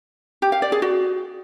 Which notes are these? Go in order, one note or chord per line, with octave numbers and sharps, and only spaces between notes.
G4
F5
D5
G#4
F#4